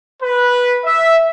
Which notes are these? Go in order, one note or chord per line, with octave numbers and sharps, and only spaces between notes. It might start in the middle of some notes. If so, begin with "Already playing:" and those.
B4
E5